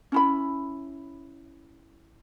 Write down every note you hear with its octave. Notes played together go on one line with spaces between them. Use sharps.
C#4 E4 B5